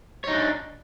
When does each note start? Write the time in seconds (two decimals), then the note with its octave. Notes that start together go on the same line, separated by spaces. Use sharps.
0.24 C#5
0.28 D#4
0.31 D4